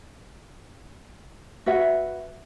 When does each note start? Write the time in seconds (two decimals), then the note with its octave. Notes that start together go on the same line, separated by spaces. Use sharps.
1.66 F#4 B4 E5 F#5